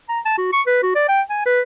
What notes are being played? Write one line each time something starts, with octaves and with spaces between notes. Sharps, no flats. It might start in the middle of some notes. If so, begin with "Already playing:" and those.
A#5
A5
F#4
C#6
B4
F#4
D5
G5
G#5
B4